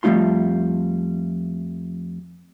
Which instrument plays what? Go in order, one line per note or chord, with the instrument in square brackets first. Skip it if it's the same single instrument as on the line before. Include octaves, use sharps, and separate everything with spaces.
[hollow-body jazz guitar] F2 G3 A3 D#4 F4 C6